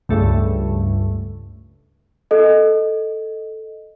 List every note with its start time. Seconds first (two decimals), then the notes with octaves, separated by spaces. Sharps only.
0.09 C#2 G2 A3
2.31 A4 D#5